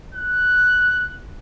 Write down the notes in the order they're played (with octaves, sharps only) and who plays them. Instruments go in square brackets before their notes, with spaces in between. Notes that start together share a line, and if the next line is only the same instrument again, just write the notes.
[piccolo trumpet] F#6